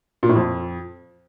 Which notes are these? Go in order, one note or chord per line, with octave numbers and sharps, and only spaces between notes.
A#2
A2
F2